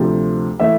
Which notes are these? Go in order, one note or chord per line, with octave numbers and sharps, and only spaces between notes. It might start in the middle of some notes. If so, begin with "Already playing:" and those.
Already playing: D2 C3 F3
E3 A3 E5